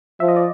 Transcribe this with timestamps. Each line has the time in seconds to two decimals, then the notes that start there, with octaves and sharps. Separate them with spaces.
0.20 F3 E5
0.28 D#5
0.36 D5